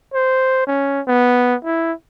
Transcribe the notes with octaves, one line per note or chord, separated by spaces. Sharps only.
C5
C#4
B3
E4